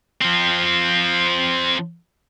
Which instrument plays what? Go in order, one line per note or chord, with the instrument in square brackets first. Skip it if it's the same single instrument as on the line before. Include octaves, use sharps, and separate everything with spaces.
[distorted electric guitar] F3 C4